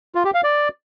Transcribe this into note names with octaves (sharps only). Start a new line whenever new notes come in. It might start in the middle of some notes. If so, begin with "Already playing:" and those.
F4
G4
F5
D5